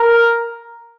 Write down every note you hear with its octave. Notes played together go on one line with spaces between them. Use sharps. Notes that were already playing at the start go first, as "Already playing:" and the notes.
Already playing: A#4